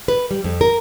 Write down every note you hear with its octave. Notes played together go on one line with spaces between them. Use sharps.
B4
G3
F2
A#4